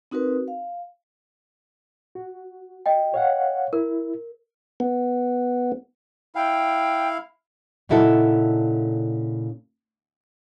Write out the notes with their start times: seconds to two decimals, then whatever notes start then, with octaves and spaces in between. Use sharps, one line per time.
0.11 C4 D#4 F#4 A#4 B4
0.48 F5
2.15 F#4
2.86 D#5 G5
3.14 C#5 F5 F#5
3.73 E4 A#4
4.80 B3
6.35 E4 F5 G5
7.89 A#2 C#3 D#4 E4 F#4 A4